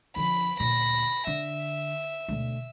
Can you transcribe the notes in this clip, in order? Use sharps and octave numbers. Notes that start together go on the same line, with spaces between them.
F2 D3 B5
D2 A#2 B5 A#6
D3 E5
D2 B2